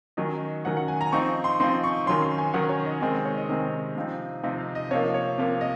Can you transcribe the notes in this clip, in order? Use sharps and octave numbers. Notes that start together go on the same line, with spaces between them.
D#3 F#3 C#4 D#5
D#3 F#3 C#4 F#5
F#5
G#5
A#5
F3 C4 D#4 C#6
C6
F3 C4 D#4 C6
C#6
D#3 F#3 C#4 C6
C6
G#5
D#3 F#3 C#4 F#5
C#5
D#5
C3 D#3 G#3 C4 D#5
D#5
C#5
D#5
C3 D#3 G#3 C4
C3 F3 C4 D#4
C3 F3 C4 D#4
F5
D#5
C3 F3 A#3 C#5
C#5
C3 F3 A#3
D#5